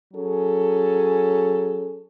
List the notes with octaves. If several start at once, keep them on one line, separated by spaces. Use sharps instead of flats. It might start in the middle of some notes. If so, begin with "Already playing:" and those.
F#3 C#4 G#4 A4